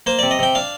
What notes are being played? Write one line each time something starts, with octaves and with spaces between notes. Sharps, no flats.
A#3 C5
C3 D5
D#5
C3 G5
D4 F5